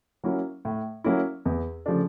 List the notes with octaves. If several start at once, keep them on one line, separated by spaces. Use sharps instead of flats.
F#3 A#3 C#4 E4
A2
F#3 A#3 C#4 E4
E2
C#3 F3 A3 D4